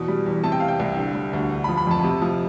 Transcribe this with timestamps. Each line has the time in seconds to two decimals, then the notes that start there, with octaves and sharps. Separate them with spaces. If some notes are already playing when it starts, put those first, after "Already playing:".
Already playing: E2 B2
0.08 G3
0.26 E2
0.44 C3 A5
0.52 G5
0.60 G3 F5
0.68 G5
0.80 C2
0.97 D3
1.15 G3
1.33 D2
1.51 D3
1.64 B5
1.69 F3
1.77 B5
1.87 F2 A5
2.04 C3
2.22 F3